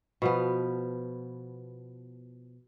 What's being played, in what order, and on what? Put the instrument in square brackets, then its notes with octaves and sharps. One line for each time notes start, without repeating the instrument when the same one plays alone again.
[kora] B2 F3 B3